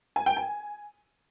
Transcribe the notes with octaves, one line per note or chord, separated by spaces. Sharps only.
G#5
G5
G#5